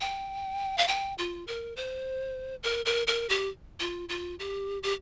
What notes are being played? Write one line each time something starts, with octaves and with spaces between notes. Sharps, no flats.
G5
F5
G5
F4
A#4
C5
A#4
A#4
A#4
G4
F4
F4
G4
G4